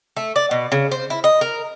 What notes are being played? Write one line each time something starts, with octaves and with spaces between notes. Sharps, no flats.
A3
D5
B2
C#3
C5
E4
D#5
A#4